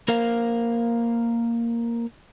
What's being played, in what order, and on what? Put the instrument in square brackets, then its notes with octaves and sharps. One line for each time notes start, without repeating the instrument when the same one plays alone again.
[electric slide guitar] A#3 A#4 C5 F5